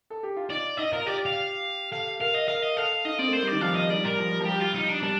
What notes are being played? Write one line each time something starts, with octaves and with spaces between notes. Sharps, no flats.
A4
G4
F4
D#4 D5
D#4 D#5
F4 A#4
G4 D5
F5
A4 F5
A#4 F5
D#5
A#4 F5
D#5
A4 F5
D#4 D#5
C4 D5
A3
A#3 C5
G3
D#3 D5
F3 F5
D#5
G3 D5
A#4
F3
G3
F3
G3 G4
F4
D#4
D4
G3 D4